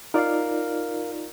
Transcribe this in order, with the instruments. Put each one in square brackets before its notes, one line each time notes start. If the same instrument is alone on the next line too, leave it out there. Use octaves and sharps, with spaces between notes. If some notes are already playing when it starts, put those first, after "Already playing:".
[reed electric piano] D#4 F4 D5 [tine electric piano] A#4 F5